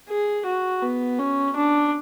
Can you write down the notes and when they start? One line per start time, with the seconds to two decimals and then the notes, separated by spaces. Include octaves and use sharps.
0.09 G#4
0.46 F#4
0.82 B3
1.19 C#4
1.56 D4